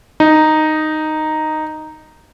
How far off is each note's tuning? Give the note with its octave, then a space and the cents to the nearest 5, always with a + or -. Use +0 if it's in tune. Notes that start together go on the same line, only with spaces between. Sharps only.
D#4 -5